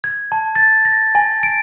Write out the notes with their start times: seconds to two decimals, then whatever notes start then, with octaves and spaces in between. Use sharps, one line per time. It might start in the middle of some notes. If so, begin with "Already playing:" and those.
0.04 G#6
0.32 A5
0.55 A6
0.85 A#6
1.15 G#5
1.43 D7